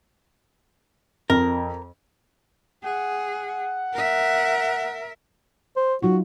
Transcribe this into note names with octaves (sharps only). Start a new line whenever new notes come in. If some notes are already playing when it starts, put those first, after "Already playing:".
F2 A#4
G#4 F#5
A#4 E5
C5
F#3 D#4 F4 F#4